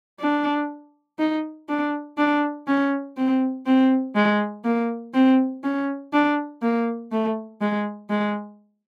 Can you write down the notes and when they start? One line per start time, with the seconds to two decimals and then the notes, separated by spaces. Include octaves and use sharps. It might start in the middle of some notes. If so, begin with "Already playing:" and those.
0.20 D4
1.19 D#4
1.69 D4
2.18 D4
2.67 C#4
3.17 C4
3.66 C4
4.15 G#3
4.65 A#3
5.14 C4
5.64 C#4
6.13 D4
6.62 A#3
7.12 A3
7.61 G#3
8.10 G#3